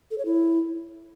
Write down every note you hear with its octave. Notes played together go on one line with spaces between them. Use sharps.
A4
C#5
E4